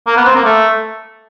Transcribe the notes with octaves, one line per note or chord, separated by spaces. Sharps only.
A#3
B3
C4
A#3
A3